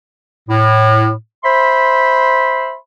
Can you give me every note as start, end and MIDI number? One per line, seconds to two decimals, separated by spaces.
0.49 1.12 45
1.44 2.76 72
1.44 2.76 76
1.44 2.76 83
1.44 2.76 84